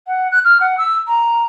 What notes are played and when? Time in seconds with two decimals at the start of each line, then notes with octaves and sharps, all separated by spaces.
0.06 F#5
0.31 F#6
0.44 F6
0.60 F#5
0.77 E6
1.07 A#5